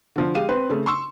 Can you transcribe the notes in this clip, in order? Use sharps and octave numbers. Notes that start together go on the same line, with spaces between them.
D3 F3
G#3 G4 F5 D#7
C4 B4
C#3 A3
C6 C#6 E6